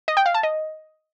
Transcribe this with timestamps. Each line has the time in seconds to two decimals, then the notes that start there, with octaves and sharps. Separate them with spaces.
0.08 D#5
0.17 G5
0.26 F5
0.34 A5
0.43 D#5